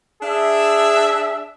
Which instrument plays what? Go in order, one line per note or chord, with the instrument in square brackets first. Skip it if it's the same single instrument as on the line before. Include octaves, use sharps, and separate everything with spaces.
[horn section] D4 G#4 E5